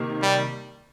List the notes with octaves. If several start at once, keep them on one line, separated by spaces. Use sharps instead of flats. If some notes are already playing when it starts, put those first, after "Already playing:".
Already playing: C3 D#3 A#3
G3